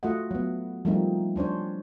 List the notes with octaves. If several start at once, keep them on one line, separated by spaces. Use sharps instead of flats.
A3 F4 F#4 D#5 F#5
F#3 B3
F3 G3 A3 A#3 C4 D#4
C#4 D4 C5 C#5